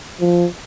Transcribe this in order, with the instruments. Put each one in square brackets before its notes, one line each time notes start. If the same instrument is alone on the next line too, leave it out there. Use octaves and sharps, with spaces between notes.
[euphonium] F3